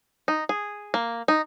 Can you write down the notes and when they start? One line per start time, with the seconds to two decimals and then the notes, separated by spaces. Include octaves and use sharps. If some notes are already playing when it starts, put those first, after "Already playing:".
0.28 D#4
0.49 G#4
0.94 A#3
1.28 D#4